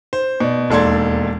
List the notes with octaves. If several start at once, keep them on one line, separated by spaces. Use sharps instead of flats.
C5
B2 D5
E1 D#2 A4 D5 C6 G#6